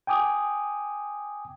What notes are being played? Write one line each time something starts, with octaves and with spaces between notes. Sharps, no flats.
G5 G#5 D6 D#6